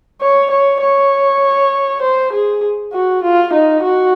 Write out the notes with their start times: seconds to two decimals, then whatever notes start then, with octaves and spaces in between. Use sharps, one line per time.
0.21 C#5
0.51 C#5
0.81 C#5
2.02 C5
2.32 G#4
2.92 F#4
3.23 F4
3.53 D#4
3.83 F#4